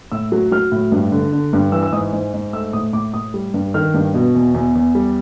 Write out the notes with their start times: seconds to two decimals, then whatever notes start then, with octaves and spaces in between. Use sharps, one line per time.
0.12 A2 E6
0.32 F#3
0.52 F#3 F6
0.72 A2
0.92 G2
1.12 D3
1.32 D3
1.53 G2
1.72 E3 E6
1.83 E6
1.92 G#2 D#6
2.13 G#2
2.34 G#2
2.53 A3 E6
2.73 A2 D#6
2.93 A2 D6
3.14 A2 D#6
3.34 G3
3.54 G2
3.74 D#3 F6
3.94 G2
4.14 B2
4.35 E2
4.54 E2
4.75 E2
4.95 G3